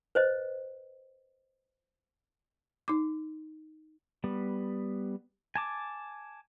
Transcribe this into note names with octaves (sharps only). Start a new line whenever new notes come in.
B4 C5 D#5
D#4 D6
G3 B3
G#5 A5 D6